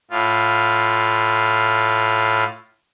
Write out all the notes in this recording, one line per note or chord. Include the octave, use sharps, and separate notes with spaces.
A2 F4